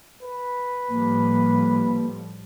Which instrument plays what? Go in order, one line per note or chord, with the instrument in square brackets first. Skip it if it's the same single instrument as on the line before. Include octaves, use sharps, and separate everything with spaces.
[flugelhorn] B4
[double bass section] A2 F3 G3 [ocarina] A#3